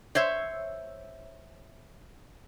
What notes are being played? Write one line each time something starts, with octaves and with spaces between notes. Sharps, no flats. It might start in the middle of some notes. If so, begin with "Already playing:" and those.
C5 C#5 E5